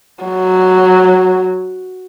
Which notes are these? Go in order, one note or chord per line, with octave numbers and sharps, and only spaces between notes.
F#3